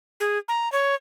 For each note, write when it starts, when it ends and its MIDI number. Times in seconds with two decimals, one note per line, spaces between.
0.20 0.38 68
0.48 0.71 82
0.72 0.95 73